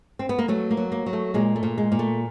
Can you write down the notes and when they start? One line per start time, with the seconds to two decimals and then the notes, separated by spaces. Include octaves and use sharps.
0.19 C4
0.29 B3
0.39 A#3
0.48 F#3 A3
0.71 A#3
0.77 F#3
0.92 A#3
1.06 F#3
1.13 A3
1.34 A#2 G#3
1.56 A3
1.63 A#2
1.78 G#3
1.92 A#2
1.99 A3